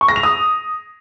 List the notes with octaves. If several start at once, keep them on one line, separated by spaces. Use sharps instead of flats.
C#6
A#6
F7
D#6